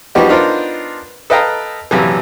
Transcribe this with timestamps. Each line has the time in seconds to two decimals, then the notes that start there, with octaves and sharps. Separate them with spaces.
0.15 F3 G3 B3 D#4 F#4 G4
0.28 B3 D4 D#4 F4 A#4 C5
1.30 A4 B4 D#5 F5 G5 A#5
1.91 A#1 F#2 C3 E3